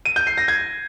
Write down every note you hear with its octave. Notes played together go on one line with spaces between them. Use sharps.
D#7
G6
C7
A#6
G#6